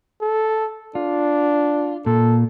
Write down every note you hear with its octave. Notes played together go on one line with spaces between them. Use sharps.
A4
D4 F4
A#2 A4